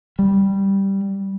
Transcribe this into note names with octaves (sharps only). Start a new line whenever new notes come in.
G3